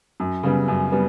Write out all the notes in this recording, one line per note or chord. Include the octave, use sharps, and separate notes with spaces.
F#2
C#3 G3 B3
F#2
G3 B3